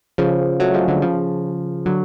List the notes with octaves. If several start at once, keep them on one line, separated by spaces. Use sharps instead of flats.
C#3 F3
F#3 A3
F3 G#3
D3 F#3
C#3 F3
D3 F#3